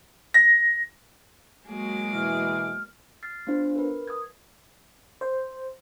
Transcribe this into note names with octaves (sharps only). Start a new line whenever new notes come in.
A#6
F#3 G#3 A#3 F#4 G#4 D6
B2 E3 F6
F6 A6 C7
B3 D4 F4 C5
A#4 B4
D#6 G#6
C5